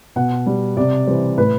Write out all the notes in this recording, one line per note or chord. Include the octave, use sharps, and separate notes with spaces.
B2 F#5
G3
C3 D5
E3 G3 C5
A2 B4